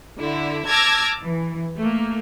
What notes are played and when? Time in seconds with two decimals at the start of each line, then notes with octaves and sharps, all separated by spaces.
0.19 D3 E4
0.68 A5 D6 E6 F6 G#6 A#6
1.21 E3
1.77 A3 A#3